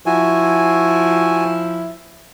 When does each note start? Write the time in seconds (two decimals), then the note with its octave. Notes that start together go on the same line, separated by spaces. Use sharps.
0.06 F3 E4 F#4 G#5